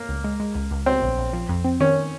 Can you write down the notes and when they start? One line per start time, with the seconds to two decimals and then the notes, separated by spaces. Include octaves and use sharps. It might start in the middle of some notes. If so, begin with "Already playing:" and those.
Already playing: A#3
0.09 C#2
0.24 G#3
0.40 G#3
0.55 C#2
0.71 C#2
0.86 F#3 C4
1.02 A#1
1.18 A#1
1.33 F3
1.49 F2
1.64 C4
1.80 D#3 C#4